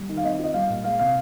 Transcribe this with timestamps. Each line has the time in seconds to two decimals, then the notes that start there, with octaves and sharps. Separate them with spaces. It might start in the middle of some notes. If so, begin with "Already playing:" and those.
Already playing: G3
0.09 D#3
0.17 F5
0.24 C4 D#5
0.39 F4 D#5
0.54 G3 F5
0.69 A#2
0.84 G#3 F5
0.99 C3 F5